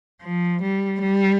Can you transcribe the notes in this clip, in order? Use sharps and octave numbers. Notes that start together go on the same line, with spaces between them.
F3
G3
G3